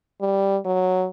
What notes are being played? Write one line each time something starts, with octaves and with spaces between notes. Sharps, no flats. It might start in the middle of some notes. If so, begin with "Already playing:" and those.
G3
F#3